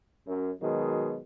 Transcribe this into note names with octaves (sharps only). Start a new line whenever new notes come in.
F#2
B2 D#3 F#3 G#3